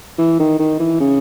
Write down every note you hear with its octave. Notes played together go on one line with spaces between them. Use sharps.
E3
D#3
D#3
E3
C#3